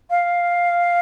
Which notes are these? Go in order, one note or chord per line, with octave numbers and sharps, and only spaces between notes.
F5